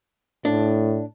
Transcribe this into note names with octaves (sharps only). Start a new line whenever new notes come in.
A2 D4